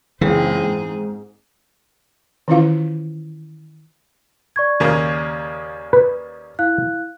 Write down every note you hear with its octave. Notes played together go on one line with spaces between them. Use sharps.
F#1 C#2 E3 G#3 C4 G#4
G#2
D#3 E3 C#4 E4 F4 F5
D5 C#6 G#6
D#2 C#3 A#3
B4
E4 F5 F#6